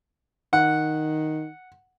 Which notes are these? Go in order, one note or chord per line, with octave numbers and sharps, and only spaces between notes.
D#3 F#5